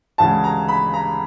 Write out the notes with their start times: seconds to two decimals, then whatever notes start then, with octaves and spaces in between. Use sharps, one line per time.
0.18 D2 C#3 E3 G#3 A5
0.44 A#5
0.68 B5
0.94 A#5